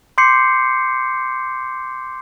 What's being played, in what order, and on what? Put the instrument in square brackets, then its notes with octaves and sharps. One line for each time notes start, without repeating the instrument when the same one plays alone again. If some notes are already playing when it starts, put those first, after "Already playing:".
[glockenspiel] C6 D6 G6 C7 C#7